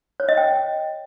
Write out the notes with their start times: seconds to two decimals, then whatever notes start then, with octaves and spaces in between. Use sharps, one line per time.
0.20 C#5
0.29 D#5
0.37 G5